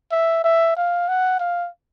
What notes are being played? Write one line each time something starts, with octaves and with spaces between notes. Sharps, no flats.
E5
E5
F5
F#5
F5